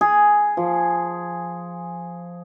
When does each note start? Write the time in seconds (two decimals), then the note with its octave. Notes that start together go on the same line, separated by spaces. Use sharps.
0.01 G#4
0.57 F3